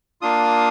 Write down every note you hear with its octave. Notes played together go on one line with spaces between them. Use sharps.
A#3 D4 F4 D#6